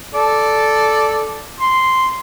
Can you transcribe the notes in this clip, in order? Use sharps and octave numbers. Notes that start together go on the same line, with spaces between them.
A4 D5
C6